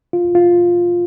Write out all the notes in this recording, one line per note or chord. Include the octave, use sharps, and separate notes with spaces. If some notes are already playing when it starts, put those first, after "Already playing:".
F4
F4